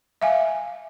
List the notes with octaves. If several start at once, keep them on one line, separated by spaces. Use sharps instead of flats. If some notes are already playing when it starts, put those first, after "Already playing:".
E5 F5 G#5